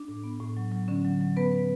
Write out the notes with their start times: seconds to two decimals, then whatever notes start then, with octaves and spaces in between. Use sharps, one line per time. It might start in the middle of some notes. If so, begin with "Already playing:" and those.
Already playing: D4
0.08 A2
0.23 B3
0.40 A2
0.57 F#3
0.72 F#3
0.88 D3 C#4
1.05 F#3
1.21 F#3
1.37 B3 B4
1.52 B3